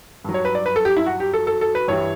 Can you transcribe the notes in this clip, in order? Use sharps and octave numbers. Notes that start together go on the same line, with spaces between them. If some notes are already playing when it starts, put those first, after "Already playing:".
G2 F#3
C#5
B4
D5
B4
A4
G4
E4
F#4
G4
A4
A4
A4
B4
G2 E3 G3 C#5